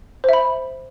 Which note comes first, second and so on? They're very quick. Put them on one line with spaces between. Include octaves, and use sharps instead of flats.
C5 E5 B5